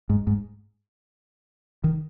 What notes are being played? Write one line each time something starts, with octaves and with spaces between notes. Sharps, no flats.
G#2
G#2
D#3